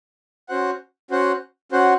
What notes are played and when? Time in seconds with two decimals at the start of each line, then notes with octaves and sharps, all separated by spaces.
0.49 C#4 F#4 C5 F#5
1.11 C#4 F#4 C5 F#5
1.72 C#4 F#4 C5 F#5